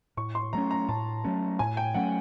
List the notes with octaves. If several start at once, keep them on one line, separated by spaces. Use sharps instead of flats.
A2 C#6
C6
F#3 A3 C#4 A#5
A#5
A2 A5
F#3 A3 C#4
A2 G#5
G5
F#3 A3 C#4 F#5